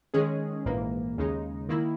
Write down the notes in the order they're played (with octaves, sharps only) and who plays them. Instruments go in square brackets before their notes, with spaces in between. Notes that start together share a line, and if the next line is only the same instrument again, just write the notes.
[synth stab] D#3 G#3 C#4 G#4
A#1 G#2 E3 A#3
D#2 C#3 G#3 D#4
D#3 A#3 E4